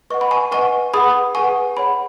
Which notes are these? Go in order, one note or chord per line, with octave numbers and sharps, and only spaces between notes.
B4 D#5 F#5 C#6
B5
G#5 C#6
B4 D#5 F#5 G#5 C#6
G#4 B4 F#5 B5 D#6
G#4 B4 F#5 G#5 C#6
G#4 C#5 F#5 B5